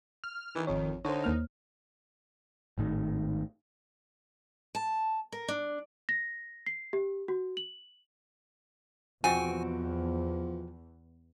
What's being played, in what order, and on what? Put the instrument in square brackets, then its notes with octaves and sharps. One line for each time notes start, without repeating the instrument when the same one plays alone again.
[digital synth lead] F6
[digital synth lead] D#3 [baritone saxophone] E3
[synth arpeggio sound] G#1 C#5 [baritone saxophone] F2
[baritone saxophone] D3 [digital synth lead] D#4 [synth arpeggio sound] C5 C#5
[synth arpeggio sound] D#2 A#3 F6
[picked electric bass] G#1 A2 D#3
[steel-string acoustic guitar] A5
A#4
D4
[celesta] A#6
C7
G4
F#4
F#7
[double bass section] E2 [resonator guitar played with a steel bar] B2 C4 F#4 [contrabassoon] F3 [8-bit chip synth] G#5